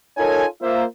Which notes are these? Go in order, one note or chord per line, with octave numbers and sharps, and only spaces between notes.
D#4 F4 A4 A#4 C#5 G#5
A#3 F4 C5 E5